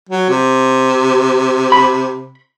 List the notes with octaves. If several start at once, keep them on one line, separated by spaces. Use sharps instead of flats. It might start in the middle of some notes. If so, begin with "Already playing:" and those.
F#3
C3
B5